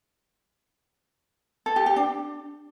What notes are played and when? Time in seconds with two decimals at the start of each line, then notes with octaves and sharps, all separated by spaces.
1.66 A4
1.76 G4
1.86 G4
1.96 D4